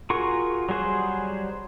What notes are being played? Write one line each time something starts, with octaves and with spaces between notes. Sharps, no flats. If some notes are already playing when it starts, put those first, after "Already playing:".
F4 F#4 G#4 A#4 C#6
F#3 G3 G#4 C5 F#5